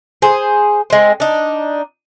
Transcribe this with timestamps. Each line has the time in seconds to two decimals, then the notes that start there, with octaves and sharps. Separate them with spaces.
0.22 G#4 C5
0.90 G#3 C4
1.20 D4 D#4